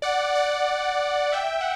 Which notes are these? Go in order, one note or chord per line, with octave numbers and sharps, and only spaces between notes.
D5 F#5
D5 F#5
E5 G5
F#5